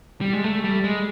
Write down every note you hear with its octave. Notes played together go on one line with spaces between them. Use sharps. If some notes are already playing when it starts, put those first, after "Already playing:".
G3
G#3
A3
G3
G#3